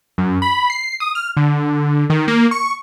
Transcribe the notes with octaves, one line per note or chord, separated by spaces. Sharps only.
F#2
B5
C7
D#6
F6
D3
D#3
A#3
C#6